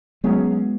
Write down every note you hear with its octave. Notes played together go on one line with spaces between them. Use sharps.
F#3 G#3 B3 C#4 G#4 C#5